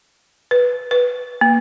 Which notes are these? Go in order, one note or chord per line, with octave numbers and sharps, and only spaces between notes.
B4
B4
A#3